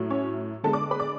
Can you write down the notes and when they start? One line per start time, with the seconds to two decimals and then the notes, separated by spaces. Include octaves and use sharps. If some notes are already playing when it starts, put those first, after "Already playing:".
Already playing: A2 F#3 A3
0.10 C#4 C#5
0.64 D3 G#3 B3 A4 A5
0.73 D5 D6
0.91 B4 B5
0.99 D5 D6